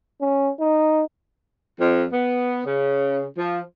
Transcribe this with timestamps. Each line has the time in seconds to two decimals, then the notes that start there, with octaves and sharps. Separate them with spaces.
0.21 C#4
0.59 D#4
1.80 F2
2.13 B3
2.65 C#3
3.38 F3